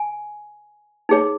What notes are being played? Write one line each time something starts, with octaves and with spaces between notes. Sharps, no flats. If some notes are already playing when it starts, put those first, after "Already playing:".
Already playing: G#5
D#4 G#4 C#5